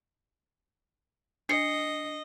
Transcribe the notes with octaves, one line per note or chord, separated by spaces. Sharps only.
D4 D#5 C7 C#7